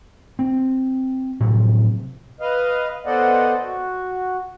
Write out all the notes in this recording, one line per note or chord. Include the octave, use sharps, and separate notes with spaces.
C4
A2 C3 F3 F#3
B4 D#5 F5
B3 A4 C5 D5 D#5 F#5
F#4